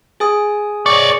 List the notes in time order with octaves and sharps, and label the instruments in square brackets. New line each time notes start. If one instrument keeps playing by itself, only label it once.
[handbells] G#4 G#5 D#6
[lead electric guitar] C#5 D5 [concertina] C#6